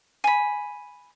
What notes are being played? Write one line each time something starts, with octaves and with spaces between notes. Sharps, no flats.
G#5 B5